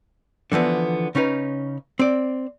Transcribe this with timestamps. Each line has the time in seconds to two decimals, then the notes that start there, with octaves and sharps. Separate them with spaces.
0.52 D3 E3 F3 B3
1.15 C#3 C#4 D#4 B4
1.99 C4 D5